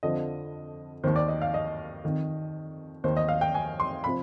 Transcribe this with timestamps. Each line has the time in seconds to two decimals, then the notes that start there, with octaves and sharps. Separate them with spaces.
0.03 F2 D3 F3 D#5
1.04 D#2 D#3 C5
1.16 D5
1.28 D#5
1.42 F5
1.54 D#5
2.04 F2 D#3
3.04 D#2 D#3 C5
3.17 D#5
3.28 F5
3.41 G5
3.54 G#5
3.80 C6
4.04 C3 F3 B5